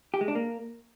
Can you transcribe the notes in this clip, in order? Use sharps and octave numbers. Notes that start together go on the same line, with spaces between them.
G4
G#3
D4
A#3